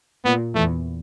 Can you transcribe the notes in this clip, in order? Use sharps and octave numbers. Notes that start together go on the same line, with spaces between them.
A#2 B3
E2 A3